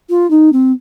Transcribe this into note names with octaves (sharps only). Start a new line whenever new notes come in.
F4
D#4
C4